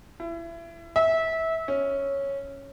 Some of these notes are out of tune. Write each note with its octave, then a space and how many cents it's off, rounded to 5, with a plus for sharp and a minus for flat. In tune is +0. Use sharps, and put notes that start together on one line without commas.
E4 +30
E5 -20
C#4 -5